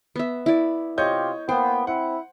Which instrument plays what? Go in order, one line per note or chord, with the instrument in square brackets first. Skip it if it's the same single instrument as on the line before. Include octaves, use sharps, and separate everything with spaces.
[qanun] B3 E5
E4 D5
[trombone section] C3 F4 G4 [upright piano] C#5 D#5 G6
[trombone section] A#3 B3 [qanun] C5 [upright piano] G5
[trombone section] C4 E4 [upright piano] F#5